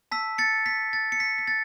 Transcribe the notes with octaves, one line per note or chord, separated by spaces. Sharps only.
A5 E6 B6
A6 C#7
B6
A6
C#7
B6
B6
A6